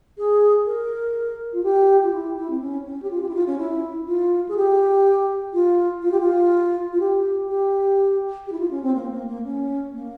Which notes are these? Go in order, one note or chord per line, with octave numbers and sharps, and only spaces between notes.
G#4
A#4
F4
G4
F4
E4
E4
C4
C#4
C#4
G4
F4
G4
E4
F4
C#4
E4
F4
G#4
G4
F4
F4
G4
F4
F4
G4
G4
G4
E4
F4
C#4
C4
A#3
A#3
A#3
C#4
A#3